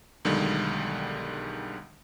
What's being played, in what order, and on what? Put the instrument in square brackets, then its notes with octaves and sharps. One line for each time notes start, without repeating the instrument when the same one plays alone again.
[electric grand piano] B1 D3 D#3 G3 G#3